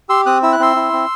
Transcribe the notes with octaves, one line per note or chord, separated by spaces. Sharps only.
G4 C6 E6
C4 D#6 F#6
E4 E6
F#6
C4 C6 E6
E4
C4